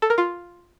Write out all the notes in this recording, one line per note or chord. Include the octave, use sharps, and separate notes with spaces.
A4
A#4
F4